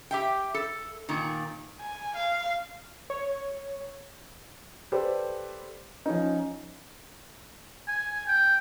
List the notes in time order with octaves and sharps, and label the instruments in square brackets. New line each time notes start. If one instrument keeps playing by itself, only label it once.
[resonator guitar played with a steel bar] G4 E5 G5
A4
A#2 D#3
[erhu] G#5
F5
[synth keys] C#5
[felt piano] G4 A4 B4 C5 D5
F3 C#4 D#4
[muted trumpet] G#5
G5